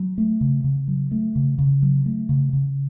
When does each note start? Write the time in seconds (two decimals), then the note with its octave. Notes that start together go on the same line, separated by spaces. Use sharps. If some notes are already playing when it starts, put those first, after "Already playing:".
Already playing: F#3
0.18 A3
0.41 C#3
0.64 C#3
0.88 F#3
1.11 A3
1.35 C#3
1.59 C#3
1.83 F#3
2.06 A3
2.29 C#3
2.53 C#3